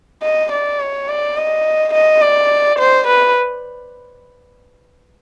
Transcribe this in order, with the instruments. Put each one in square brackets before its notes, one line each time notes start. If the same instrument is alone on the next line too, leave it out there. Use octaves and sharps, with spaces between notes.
[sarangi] D#5
D5
C#5
D5
D#5
D#5
D5
C5
B4